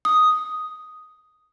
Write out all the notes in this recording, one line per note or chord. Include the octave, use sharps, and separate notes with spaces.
D#6